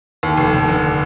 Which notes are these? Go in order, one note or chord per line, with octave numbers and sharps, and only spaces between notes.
D#2
F1
F1
D3